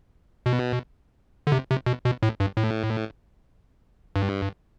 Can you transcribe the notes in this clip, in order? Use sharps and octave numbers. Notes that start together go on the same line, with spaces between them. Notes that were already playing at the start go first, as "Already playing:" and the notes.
B2
D3
C3
C3
B2
B2
A2
G2
A2
G2